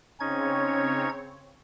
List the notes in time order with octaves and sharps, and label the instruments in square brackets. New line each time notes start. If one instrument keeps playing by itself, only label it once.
[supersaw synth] C#3 C4 C#5 [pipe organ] C#4 D#4 G#6